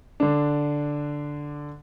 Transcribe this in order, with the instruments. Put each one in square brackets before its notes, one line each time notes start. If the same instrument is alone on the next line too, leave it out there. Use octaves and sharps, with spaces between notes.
[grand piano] D3 D4